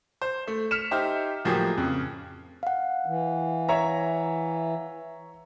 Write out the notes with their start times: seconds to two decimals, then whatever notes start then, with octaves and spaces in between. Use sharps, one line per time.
0.22 C5
0.47 A3
0.71 F6 B6 C#7 E7 F7
0.91 D#4 G4 C5 E5
1.45 A2 F3 F#3 A#3 G4 G#4
1.77 F2 C#3
2.63 F5 F#5
3.06 E3
3.69 C#5 E5 A#5